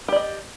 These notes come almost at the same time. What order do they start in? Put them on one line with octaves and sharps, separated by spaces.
G4 D5 D#5